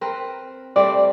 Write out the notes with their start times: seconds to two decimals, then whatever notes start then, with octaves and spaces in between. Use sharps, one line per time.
0.01 C4 A#4 B4
0.76 G3 A3 C4 D5